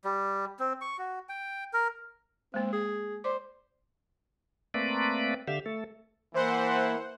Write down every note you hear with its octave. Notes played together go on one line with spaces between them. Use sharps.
G3
C4
C#6
F#4
G5
A#4
G#3 A#3 C4
G#4
C5 D5 D6
A3 A#3 C4 B4 D5
D3 G4 E5 F5
A3 A4
E3 A#3 C5 F#5